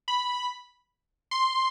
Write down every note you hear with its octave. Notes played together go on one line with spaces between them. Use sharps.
B5
C6